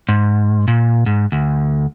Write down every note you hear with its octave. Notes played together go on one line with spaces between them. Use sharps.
G#2
A#2
G#2
D2